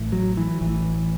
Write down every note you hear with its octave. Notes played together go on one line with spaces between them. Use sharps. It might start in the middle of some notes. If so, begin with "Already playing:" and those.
Already playing: A1 A2
F#3
E3
A1 A2 E3